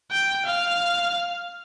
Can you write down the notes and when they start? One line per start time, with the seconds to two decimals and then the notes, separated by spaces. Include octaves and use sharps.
0.11 G5
0.45 F5